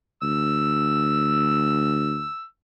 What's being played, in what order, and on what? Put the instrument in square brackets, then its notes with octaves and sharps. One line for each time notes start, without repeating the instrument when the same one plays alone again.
[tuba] D2 [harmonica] E6